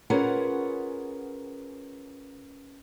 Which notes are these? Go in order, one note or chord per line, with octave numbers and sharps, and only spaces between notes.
C#4 F4 G#4 A#4 B4 F#5